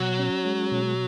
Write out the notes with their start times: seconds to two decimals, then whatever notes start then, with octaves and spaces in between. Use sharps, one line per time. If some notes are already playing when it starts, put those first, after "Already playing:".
Already playing: B2 F#3
0.19 C#4
0.45 G#3
0.72 B2